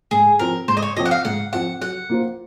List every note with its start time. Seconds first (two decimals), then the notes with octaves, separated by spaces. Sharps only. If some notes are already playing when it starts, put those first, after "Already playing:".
0.11 G#2 G#4
0.39 F3 C4 A#4
0.68 G#2 C5
0.77 D#5
0.82 C#5
0.97 F3 C4 D#5
1.05 F#5
1.11 F5
1.25 G#2 F#5
1.53 F3 C4 F#5
1.81 F#3 F#5
2.10 A#3 F4 C5